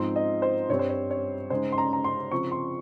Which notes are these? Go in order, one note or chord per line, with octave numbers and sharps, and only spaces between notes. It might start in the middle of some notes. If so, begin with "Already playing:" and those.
Already playing: G#2 F3 C4 D#4 C6
D#5
C5
G2 G3 C4 C#5
C5
C#5
C#5
C#3 G#3 D#4 C5
C6
A#5
A#5
C6
C#3 F3 C4 C#6
C6